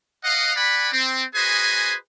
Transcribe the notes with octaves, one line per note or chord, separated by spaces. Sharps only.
D#5 F5 F#5
D5 F#5 G#5 B5
C4
F#4 G#4 B4 C5 D#5 G#5